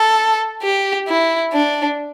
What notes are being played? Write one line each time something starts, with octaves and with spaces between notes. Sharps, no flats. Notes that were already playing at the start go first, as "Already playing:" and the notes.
Already playing: A4
G4
E4
D4